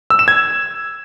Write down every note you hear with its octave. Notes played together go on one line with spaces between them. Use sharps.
E6
E7
G#6